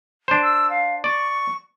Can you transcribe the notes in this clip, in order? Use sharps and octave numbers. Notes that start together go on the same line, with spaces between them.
D4 C5
E6
F5
D5 C#6